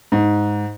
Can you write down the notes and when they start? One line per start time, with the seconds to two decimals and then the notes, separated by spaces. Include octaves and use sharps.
0.12 G#2